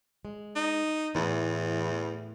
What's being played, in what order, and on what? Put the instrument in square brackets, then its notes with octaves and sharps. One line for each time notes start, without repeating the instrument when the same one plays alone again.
[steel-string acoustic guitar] G#3
[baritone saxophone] D#4
[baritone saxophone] E2 [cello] A2 [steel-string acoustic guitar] E3